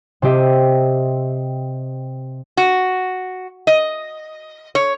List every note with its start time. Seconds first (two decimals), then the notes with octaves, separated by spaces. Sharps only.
0.22 C3 C4 G4 D#5 E5
2.57 F#4
3.67 D#5
4.75 C#5